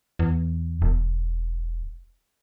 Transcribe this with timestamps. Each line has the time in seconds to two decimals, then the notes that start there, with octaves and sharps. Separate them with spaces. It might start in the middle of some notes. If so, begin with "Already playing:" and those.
0.19 E2
0.82 E1